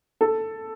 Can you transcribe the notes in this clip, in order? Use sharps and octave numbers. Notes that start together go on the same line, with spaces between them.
A4